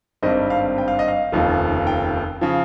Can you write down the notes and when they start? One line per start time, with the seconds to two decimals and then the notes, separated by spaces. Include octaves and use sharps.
0.22 G#1 G2 G3 C4 D#5
0.50 F5
0.78 G5
0.88 F5
0.99 D#5
1.08 F5
1.32 F1 D#2 C#3 F3
1.87 G5
2.41 C#3 F3